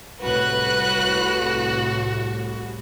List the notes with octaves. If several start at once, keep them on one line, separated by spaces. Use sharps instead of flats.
C2 A2 F#4 B4 F#6